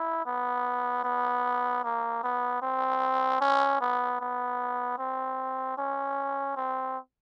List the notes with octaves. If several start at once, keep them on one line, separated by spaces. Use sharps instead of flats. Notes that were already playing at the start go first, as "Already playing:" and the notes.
Already playing: E4
B3
B3
A#3
B3
C4
C#4
B3
B3
C4
C#4
C4